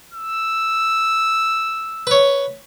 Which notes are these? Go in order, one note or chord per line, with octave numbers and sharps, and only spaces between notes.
E6
B4 C#5